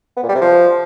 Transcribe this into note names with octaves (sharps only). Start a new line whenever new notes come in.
B3
A#2
G3
C3
F3